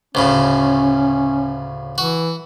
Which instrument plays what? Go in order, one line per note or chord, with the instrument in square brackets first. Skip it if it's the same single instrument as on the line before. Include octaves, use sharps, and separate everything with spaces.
[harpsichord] D2 A2 C#3 [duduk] C#4
[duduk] E3 [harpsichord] F#4